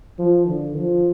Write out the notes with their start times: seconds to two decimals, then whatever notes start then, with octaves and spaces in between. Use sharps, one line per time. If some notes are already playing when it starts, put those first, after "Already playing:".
0.19 F3
0.48 D3
0.77 F3